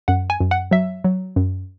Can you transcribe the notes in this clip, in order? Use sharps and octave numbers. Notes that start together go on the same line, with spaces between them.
F#2 F#5
G#5
F#2
F#5
F#3 E5
F#3
F#2